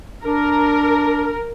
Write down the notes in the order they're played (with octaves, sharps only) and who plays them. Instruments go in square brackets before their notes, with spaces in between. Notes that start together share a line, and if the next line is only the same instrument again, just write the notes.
[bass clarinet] D4 [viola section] A#4